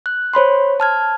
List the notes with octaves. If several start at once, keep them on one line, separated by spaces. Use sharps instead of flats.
F#6
C5 C#5 B5 C6
A5 F6 G#6